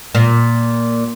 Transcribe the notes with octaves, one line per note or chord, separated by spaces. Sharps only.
A#2